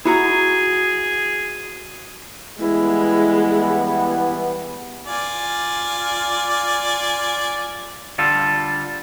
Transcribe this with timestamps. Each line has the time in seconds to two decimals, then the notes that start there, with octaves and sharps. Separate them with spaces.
0.05 E4 F#4 G#4 A#5
2.60 E3 G3 G#3 B3 E4
5.07 F4 D5 G#5
8.18 D3 G3 F4 A4